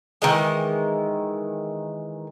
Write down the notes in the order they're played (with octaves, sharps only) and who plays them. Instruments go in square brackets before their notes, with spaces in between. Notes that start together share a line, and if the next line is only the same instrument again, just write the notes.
[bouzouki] D#3 E3 G#3